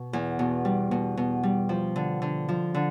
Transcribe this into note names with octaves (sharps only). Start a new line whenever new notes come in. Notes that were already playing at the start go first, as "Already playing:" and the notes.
Already playing: B2
E2
B2
G3
B2
B2
G3
F3
D3
D3
F3
D3